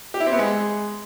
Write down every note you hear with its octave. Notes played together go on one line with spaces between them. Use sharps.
G4
E4
C4
B3
G#3